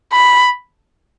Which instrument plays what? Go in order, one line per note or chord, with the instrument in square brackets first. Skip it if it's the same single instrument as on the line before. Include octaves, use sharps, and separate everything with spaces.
[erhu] B5